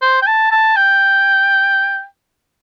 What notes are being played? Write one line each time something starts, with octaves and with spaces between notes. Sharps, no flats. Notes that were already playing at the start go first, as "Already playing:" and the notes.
C5
G5
A5
A5
G5